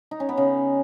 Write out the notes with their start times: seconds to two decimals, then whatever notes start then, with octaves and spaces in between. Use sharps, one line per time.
0.11 D#4
0.20 C#4
0.29 B3
0.37 C#3